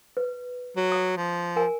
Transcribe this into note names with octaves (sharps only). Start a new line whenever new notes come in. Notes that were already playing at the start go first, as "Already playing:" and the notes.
B4
F#3
D#6
F3
A#4 G#5